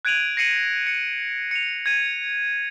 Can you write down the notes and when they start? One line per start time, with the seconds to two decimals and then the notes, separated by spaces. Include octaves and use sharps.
0.05 F#6 G#6 D7 D#7 F7 F#7
0.37 A#6 C7 C#7 D#7 F#7
0.87 C#7
1.51 C#7 F7
1.86 G#6 D#7